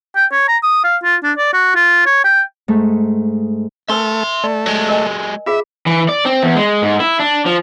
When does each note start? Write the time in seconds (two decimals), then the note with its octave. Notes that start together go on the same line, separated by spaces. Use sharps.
0.16 G5
0.32 C#5
0.48 A#5
0.63 D#6
0.84 F5
1.03 F4
1.23 D4
1.37 D5
1.53 F#4
1.75 F4
2.06 C#5
2.24 G5
2.68 G#2 A3
3.89 A3 D4 A#4 B4 E5 C6
4.44 A3 D5
4.66 F#3 G#3
4.88 A#4 D#5 G#5
5.47 F4 G#4 E5 F5
5.86 E3
6.08 D5
6.25 C4
6.43 E2
6.55 G#3
6.82 G#2
7.00 E4
7.20 D4
7.46 F3